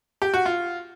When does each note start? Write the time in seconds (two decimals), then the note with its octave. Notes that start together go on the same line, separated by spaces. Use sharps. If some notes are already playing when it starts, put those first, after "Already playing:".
0.22 G4
0.34 F#4
0.46 F4